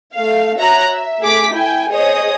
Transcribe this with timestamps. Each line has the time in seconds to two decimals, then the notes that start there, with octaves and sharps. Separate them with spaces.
0.15 A3 F5
0.58 F#4 C#5 E5 A#5 F#6
0.90 E5
1.21 A3 G#4 D6 B6
1.54 E4 G5 G#5
1.91 G#4 C5 C#5 D#5 D#6